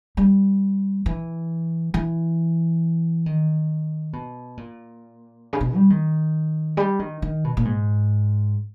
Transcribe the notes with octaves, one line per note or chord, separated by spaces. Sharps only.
G3
E3
E3
D#3
B2
A#2
C#3
B2
G3
D#3
G3
D#3
D#3
B2
A#2
G#2